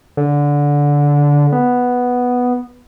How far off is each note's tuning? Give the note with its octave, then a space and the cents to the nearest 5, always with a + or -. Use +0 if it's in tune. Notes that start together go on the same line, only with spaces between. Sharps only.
D3 -15
B3 +0